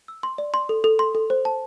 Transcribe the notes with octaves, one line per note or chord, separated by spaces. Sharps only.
E6
C6
D5
C6
A4
A4
C6
A4
C5
A5